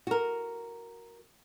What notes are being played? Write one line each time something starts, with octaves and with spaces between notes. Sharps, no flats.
F#4 A#4